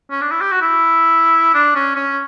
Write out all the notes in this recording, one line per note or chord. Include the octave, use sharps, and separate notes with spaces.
C#4
D4
E4
G4
F#4
E4
D4
C#4
C#4